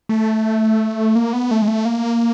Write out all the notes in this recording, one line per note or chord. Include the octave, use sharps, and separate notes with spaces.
A3
A#3
B3
A3
G#3
A3
A#3